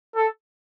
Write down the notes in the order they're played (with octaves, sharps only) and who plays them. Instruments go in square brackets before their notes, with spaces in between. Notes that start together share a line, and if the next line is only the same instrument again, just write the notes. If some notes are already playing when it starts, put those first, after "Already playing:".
[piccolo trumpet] A4